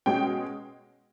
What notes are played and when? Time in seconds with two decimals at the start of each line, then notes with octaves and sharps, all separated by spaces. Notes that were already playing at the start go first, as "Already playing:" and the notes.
0.06 B2 G#3 C#4 G5